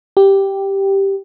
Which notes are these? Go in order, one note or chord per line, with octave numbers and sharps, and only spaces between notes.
G4